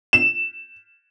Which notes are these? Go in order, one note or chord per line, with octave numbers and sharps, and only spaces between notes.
E7